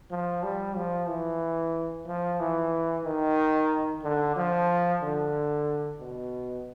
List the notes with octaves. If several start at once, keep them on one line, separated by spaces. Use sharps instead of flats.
F3
G3
F3
E3
F3
E3
D#3
D3
F3
D3
B2